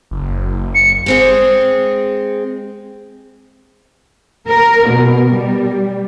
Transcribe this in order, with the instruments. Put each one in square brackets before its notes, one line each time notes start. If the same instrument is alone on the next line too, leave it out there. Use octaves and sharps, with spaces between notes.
[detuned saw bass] F#1
[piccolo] C#7
[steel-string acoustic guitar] G#3 C4 G#4
[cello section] A#4
B2
G3